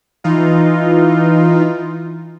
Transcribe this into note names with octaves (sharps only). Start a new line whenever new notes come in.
E3 D#4 F4